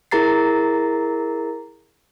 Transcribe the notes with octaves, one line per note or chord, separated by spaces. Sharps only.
E4 G#4 A#4 A#5 A6 C7